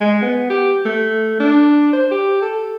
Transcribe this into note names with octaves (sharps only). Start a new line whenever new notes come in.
G#3
B3
G4
A3
D4
C5
G4
A4